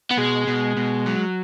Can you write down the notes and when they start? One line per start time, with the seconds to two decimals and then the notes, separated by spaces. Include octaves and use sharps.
0.11 B3
0.17 B2 G#3
0.47 B2
0.77 B2
1.06 F#3